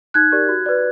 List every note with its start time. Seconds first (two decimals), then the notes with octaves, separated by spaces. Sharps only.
0.14 D#4 F#6 G#6
0.32 G4 A#4 D5
0.49 F#4
0.66 B4 D5